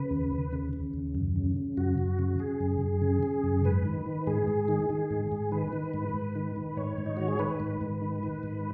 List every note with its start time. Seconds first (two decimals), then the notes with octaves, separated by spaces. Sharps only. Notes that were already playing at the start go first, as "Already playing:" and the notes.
Already playing: C#3 B4
0.11 D#2
0.32 D#2
0.53 C#3
0.73 C#3
0.94 D#2
1.15 F#2
1.36 C#3
1.56 C#3
1.77 F#2 F#4
1.98 F#2
2.19 C#3
2.39 C#3 G#4
2.60 F#2
2.81 F#2
3.02 C#3
3.23 C#3
3.44 F#2
3.65 G#2 B4
3.85 D#3
4.06 D#3
4.27 G#2 G#4
4.48 G#2
4.68 D#3
4.90 D#3
5.10 G#2
5.32 G#2
5.52 D#3 B4
5.73 D#3
5.94 G#2
6.14 G#2
6.35 D#3
6.56 D#3
6.77 G#2 C#5
6.98 G#2
7.06 D#4
7.17 D#3 F#4
7.28 G#4
7.39 D#3 B4
7.60 G#2
7.81 G#2
8.02 D#3
8.23 D#3
8.43 G#2